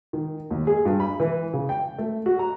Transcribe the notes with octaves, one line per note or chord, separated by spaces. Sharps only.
D#3
D#2
G#4
G2
B5
E3
C#3
G5
A3
F#4
A#5